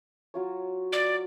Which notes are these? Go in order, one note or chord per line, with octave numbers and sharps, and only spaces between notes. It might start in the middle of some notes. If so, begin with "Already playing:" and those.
F#3 F4 C#5
D5